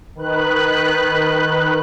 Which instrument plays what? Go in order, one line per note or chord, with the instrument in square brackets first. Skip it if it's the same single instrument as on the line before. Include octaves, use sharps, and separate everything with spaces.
[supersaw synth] D#3 B4 F#6